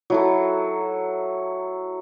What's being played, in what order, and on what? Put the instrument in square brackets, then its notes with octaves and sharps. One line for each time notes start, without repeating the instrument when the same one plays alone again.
[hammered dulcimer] F#3 E4 A4